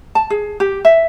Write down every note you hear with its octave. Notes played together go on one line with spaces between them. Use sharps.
A5
G#4
G4
E5